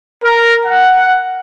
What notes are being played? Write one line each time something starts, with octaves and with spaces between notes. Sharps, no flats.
A#4
F#5